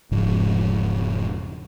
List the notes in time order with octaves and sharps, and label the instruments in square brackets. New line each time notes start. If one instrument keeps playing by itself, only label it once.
[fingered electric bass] E1 G#2 C#3 F3